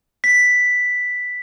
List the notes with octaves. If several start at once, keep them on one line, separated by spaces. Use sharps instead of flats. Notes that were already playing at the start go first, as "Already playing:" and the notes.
B6